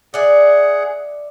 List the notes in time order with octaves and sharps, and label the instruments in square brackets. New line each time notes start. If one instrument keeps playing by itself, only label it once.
[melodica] G#4 F#5 [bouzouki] D5 E5